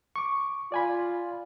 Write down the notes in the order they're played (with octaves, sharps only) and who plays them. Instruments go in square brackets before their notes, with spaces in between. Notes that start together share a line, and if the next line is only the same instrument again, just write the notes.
[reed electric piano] C#6 D6
[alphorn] F4 [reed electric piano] D5 G#5 B5